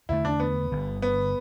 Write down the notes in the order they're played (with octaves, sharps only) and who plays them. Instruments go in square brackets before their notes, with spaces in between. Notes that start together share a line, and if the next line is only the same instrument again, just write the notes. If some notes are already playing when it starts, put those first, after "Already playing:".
[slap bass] E2 D3 A3 [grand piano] E4
[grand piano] D4
B3
[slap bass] G1 G2 D3
[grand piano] B3